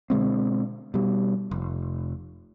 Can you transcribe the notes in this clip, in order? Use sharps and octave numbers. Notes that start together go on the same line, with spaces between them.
B2 D3 G#3 C4
B2 G3
F1